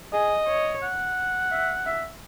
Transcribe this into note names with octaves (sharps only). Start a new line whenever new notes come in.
G#4 D#5
C#5
F#5
E5
E5